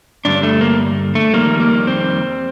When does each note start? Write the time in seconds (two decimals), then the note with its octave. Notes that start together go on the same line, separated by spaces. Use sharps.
0.25 G2 D3 G3 D4
0.43 A3
0.61 A#3
1.15 A3
1.33 F2 D#3 G3 A#3
1.60 A#3
1.87 C4